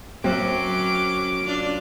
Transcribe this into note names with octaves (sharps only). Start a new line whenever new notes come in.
F#2 F#3 C4 C#4 D6
D4 F4 D5